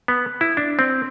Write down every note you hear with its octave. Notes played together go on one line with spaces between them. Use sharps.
B3
E4
D4
C4